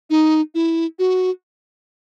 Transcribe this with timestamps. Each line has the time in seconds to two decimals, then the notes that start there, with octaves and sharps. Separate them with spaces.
0.10 D#4
0.55 E4
0.99 F#4